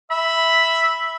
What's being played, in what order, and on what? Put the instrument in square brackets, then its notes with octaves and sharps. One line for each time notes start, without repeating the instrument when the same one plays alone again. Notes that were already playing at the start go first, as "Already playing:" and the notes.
[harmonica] E5 [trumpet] B5